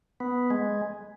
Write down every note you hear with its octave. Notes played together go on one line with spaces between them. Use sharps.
B3
G#3